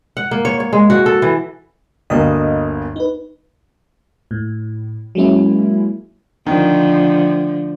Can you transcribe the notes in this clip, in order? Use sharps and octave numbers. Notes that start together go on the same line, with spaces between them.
F#5
A#3
C#5
C#5
G#3
F#4
A4
E3
G1 D2 A#3 D#5 D#6
D#4 B4
A2
F#3 G#3 A#3 C#4 E4
D3 D#3 F3 A3